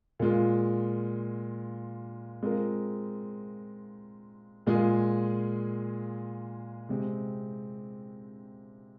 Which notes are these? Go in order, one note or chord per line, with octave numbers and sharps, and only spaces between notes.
A#2 G#3 F4
G#3 C4 F4 A#4
A#2 G#3 F4 G#4
C3 G#3 C4